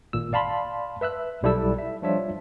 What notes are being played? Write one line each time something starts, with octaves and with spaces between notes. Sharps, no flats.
G#1 A#2 E6
D5 F5 A5 B5 C6
B4 E5 E6 F#6
B1 G3 E4 A4 E6
E5
F3 G3 D4 F4 C#5 E5